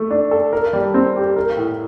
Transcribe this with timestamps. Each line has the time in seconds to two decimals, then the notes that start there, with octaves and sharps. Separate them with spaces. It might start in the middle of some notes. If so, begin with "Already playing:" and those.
Already playing: A3
0.11 D4
0.31 A4
0.53 A#4
0.73 G3
0.94 C4
1.16 G4
1.36 A#4
1.57 A2